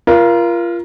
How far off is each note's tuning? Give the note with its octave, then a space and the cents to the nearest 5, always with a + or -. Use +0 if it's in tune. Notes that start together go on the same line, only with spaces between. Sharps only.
F4 -25 A#4 +25